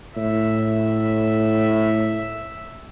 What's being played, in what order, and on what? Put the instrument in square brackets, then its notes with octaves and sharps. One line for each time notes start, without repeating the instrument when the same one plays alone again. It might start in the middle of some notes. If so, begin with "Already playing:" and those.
[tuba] A2 [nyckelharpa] E5